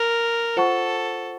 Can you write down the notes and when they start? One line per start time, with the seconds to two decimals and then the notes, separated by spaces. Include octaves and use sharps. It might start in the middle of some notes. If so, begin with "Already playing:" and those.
Already playing: A#4
0.57 F4 A4 C5 F#5 A5 C#6